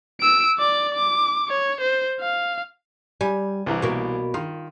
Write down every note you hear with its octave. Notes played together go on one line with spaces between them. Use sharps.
E6 D7
D5 D6
D6
C#5
C5
F5
G3 G#5
C2 E3 A#5
B2 A#3
D#3 F4